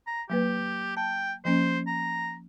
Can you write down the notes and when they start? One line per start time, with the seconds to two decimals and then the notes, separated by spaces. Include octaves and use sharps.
0.07 A#5
0.30 F#3 A#3 G4 B4
0.97 G5 A5
1.45 F3 A#3 C#4 C5
1.87 A#5